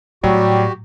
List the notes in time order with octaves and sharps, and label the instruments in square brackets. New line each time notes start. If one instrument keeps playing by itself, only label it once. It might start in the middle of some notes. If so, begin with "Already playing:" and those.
[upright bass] A2 [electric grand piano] F#3 [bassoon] G3 [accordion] F#4 G4